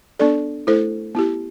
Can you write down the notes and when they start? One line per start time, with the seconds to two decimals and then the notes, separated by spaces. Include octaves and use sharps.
0.19 B3 D4 A4 D5
0.67 A3 E4 A4 C5
1.15 B3 E4 G4